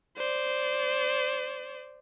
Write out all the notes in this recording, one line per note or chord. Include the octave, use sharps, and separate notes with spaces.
C5 D5